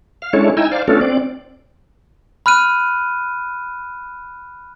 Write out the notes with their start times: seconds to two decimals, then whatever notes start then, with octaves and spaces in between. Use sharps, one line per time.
0.22 F5
0.33 G#3 C#4 D4 E4 A4 C#5
0.57 D#4 E4 G5 G#5 A#5 E6
0.72 C5 D5 F5
0.88 A3 B3 C#4 D4 F4 A4
1.01 C4 D5
2.46 B5 F6 F#6 D#7